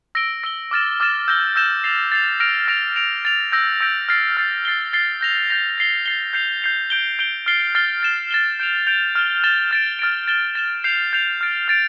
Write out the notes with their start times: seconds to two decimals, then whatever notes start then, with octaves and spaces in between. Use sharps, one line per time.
0.15 E6 A#6 D7 G7
0.43 E6 A#6 D7 G7
0.71 D6 F6 A6 E7
1.00 D6 F6 A6 E7
1.28 E6 G6 A#6 E7 G7
1.56 E6 G6 A#6 E7 G7
1.84 A6 C7 F7
2.12 A6 C7 F7
2.40 F6 A#6 D7 F7
2.68 F6 A#6 D7 F7
2.96 A6 D7 F7
3.25 A6 D7 F7
3.52 E6 G6 A#6 D7
3.81 E6 G6 A#6 D7
4.09 F6 A6 C7
4.37 F6 A6 C7
4.65 A6 C7 G7
4.93 A6 C7 G7
5.21 G6 A#6 F7
5.50 G6 A#6 F7
5.78 A6 C7 G7
6.06 A6 C7 G7
6.33 G6 C7 F7
6.62 G6 C7 F7
6.90 G6 D7 G7
7.19 G6 D7 G7
7.46 F6 A6 C7 G7
7.75 F6 A6 C7 G7
8.03 A6 E7 G7
8.31 A6 E7 G7
8.60 G6 D7 F7
8.87 G6 D7 F7
9.15 F6 A6 E7 G7
9.44 F6 A6 E7 G7
9.71 F6 A6 D7
9.99 F6 A6 D7
10.28 A6 E7 G7
10.55 A6 E7 G7
10.84 G6 C7 F7
11.13 G6 C7 F7
11.41 F6 A6 D7
11.68 F6 A6 D7